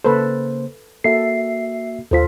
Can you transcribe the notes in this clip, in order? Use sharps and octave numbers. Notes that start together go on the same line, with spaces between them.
C#3 A#3 A4 B4 C5
A#3 F#4 A4 E5 C7
D#2 F4 A4 C5 B6